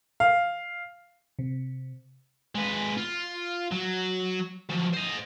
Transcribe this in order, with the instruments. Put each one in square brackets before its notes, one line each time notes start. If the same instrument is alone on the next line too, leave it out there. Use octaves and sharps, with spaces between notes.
[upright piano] F5
[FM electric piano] C3
[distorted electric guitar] G#3 B4
F4
F#3
F3 F#3
C5 D#5